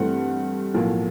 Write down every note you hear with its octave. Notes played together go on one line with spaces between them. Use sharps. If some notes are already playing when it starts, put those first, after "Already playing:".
Already playing: G2 E3 A3 C4 F#5
B1 A2 F3 A#3